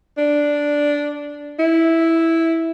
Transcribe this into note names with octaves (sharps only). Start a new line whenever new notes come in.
D4
E4